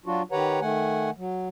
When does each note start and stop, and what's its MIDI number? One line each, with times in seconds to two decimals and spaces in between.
0.06 0.22 54
0.06 0.22 62
0.06 0.22 65
0.06 0.22 66
0.32 0.60 51
0.32 0.60 67
0.32 0.60 71
0.32 0.60 73
0.32 0.60 78
0.32 0.60 82
0.61 1.10 51
0.61 1.10 57
0.61 1.10 78
0.61 1.10 80
1.17 1.48 54